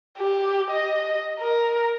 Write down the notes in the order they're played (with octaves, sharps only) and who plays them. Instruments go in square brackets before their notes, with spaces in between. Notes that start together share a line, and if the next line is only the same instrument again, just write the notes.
[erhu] G4
D#5
A#4